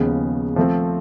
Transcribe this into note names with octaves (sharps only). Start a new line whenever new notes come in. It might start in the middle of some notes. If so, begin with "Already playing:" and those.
Already playing: D#2 C#3 F3 G#3 B3
F3 A3 C4